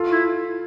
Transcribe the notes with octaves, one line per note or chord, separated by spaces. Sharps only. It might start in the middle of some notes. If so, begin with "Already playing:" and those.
Already playing: F4 A4
E4